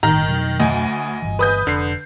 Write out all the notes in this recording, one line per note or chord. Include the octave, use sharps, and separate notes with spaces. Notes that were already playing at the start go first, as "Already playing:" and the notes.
G1 A2 D#3 A#5
F2 B2 F#3
D2 D#5 G#5
G1 C2 E3
B4 D#6 G6
F1 D3 C7